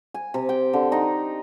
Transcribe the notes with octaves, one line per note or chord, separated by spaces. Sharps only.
G#5
C3
G5
D3
D#4